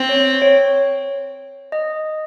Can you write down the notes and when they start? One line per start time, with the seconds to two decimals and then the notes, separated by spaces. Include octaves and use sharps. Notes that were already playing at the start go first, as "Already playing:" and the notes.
Already playing: C4
0.09 C#5
0.42 C#5
1.72 D#5